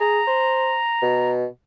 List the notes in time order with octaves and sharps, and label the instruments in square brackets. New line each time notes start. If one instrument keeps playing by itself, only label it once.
[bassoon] G#4 [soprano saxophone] A#5
[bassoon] C5
B2